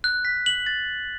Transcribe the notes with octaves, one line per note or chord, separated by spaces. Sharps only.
F#6
B6
F#7
A6